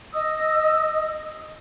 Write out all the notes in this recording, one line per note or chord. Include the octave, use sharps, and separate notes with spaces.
D#5 D#6 E6